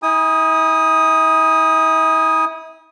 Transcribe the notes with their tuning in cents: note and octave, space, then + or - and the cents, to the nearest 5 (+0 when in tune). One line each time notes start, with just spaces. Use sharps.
E4 -40 G#5 -25 D#6 +0